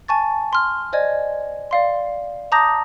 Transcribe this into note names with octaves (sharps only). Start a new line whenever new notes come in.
G#5 A5 C#6 A6
C6 F6
C5 D5 D#5 G#5 G#6
D5 F5 C6
A5 A#5 D6 D#6 G6 A#6